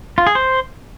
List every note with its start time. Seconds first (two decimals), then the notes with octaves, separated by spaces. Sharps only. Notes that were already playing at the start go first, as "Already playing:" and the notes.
0.18 F4
0.27 G#4
0.35 C5